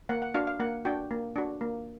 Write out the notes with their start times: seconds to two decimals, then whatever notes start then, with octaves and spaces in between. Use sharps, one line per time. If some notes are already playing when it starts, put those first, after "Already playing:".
0.09 A#3 F#5
0.22 F#5
0.34 D4 F#4 F5
0.47 F5
0.60 A#3 F#5
0.85 D4 F#4 G5
1.11 A#3
1.36 D4 F#4
1.61 A#3